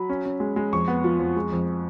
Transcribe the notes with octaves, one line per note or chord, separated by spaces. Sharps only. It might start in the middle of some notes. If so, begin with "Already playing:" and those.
Already playing: F#3 B5
C#4
C#4
G#3
G#3
F2 C#6
B3
F3
F2
G#3
F2